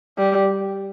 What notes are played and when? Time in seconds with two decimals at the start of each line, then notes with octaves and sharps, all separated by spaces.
0.18 G3